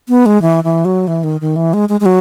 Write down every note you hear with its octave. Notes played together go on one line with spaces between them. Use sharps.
B3
G#3
E3
E3
F#3
E3
D#3
D#3
E3
G#3
G#3
G#3
F#3